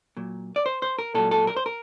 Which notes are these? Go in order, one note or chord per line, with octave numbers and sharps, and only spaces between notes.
A#2 F#3
D5
C5
C5
A#4
A#2 F#3 A4
A4
A#4
C5
A#4